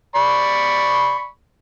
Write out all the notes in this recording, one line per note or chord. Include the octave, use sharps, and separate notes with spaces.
D5 B5 C#6